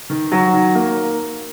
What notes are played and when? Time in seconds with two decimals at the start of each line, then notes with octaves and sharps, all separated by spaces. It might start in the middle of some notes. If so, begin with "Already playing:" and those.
0.10 D#3
0.32 F#3
0.53 D#3
0.75 A#3